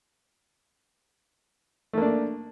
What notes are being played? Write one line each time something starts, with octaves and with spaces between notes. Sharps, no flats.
A3 A#3 D4